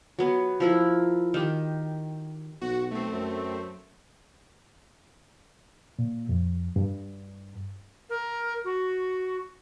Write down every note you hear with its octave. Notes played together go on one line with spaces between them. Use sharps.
F#3 B3
F3 E4 A#4
D#3 G4
B1 F#4
A3 C4
F#2
A#2
F2
G2
A#4
F#4